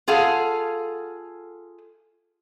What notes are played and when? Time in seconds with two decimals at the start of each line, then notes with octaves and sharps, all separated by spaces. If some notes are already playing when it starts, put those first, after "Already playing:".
0.08 F4 G#4 A4 F5 F#5